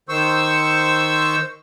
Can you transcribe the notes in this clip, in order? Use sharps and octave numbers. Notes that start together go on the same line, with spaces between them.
D#3 C5 C#6 E6